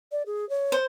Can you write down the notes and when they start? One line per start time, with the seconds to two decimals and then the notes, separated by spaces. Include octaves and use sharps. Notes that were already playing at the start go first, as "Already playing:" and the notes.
0.11 D5
0.26 G#4
0.49 C#5
0.72 C5